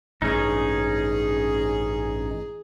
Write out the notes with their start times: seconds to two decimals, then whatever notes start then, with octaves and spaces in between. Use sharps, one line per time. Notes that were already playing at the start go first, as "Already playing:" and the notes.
0.22 A1 G2 C#4 D#4 G#4